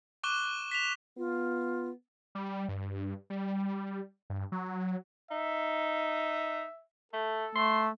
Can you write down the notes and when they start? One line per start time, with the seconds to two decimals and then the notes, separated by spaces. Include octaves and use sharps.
0.23 C#6 D6 F#6 E7 G7
0.71 B6 E7 F7
1.18 B3 F4
2.35 G3
2.69 G2
3.30 G3
4.30 G2
4.52 F#3
5.31 D#4 E5
7.13 A3 A4
7.55 A3 C6